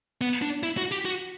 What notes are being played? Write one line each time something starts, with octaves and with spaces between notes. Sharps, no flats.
B3
D4
E4
F#4
G4
F#4